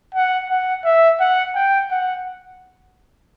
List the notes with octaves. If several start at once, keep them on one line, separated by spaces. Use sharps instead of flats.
F#5
F#5
E5
F#5
G5
F#5